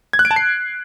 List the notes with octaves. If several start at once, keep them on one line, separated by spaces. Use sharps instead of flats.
G#6
F#6
D7
A5
C7